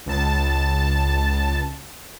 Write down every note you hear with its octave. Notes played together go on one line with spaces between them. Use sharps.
C#2 A5